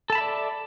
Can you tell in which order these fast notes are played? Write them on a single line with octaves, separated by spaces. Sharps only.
A4 A5 B5 E5 D5